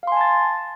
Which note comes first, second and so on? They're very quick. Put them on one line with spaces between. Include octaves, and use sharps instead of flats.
F5 C6 G#5 A5 A6